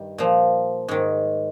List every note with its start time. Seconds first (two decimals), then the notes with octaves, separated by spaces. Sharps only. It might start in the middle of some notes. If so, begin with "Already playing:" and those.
Already playing: G2 D#3 G3
0.18 A#2 F3
0.88 G#2 D#3